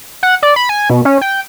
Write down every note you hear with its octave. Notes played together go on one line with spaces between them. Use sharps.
F#5
D5
B5
G#5
B2
C#4
G5